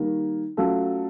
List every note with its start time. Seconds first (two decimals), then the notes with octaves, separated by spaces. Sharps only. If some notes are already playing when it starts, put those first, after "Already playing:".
Already playing: D#3 G3 A#3
0.57 F#3 A3 C#4 F4 A4